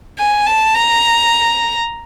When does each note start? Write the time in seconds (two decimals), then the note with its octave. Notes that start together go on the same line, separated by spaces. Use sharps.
0.18 G#5
0.46 A5
0.74 A#5